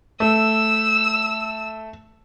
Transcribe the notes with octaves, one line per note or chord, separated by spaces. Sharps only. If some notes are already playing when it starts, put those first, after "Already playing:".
A3 E6